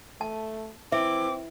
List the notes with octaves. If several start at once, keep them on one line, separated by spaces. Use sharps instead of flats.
A3 A5
E3 C4 E5 D6